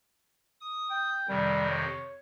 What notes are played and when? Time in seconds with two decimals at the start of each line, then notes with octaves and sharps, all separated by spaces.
0.60 D#6
0.90 G5
1.29 F2 C3 D#3 G3
1.69 C#5